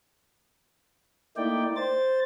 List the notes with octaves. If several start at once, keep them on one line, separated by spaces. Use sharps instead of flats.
A3 A#3 D#4 E4 D5 G5
C5 A6